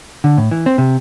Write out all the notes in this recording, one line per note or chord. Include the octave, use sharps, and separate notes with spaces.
D3
A2
E3
C4
C3